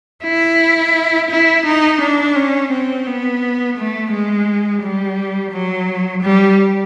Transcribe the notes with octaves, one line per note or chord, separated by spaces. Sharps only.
E4
E4
D#4
D4
C#4
C4
B3
A3
G#3
G3
F#3
G3